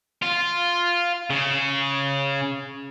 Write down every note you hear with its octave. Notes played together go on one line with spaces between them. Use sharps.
F4
C#3